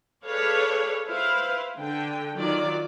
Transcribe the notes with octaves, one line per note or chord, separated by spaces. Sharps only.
G#4 A4 B4 C#5 D5 F5
E4 B4 C5 F5
D3 G5
D#3 F#3 F4 D5